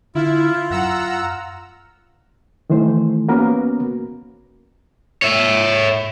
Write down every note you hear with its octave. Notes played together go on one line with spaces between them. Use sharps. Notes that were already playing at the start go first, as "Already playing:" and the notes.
D3 E4 F4
F#2 F#5 A#5 E6
D#3 E3 A3 C5
A#3 B3 C#4 F#4 A#4 B4
C#5 E5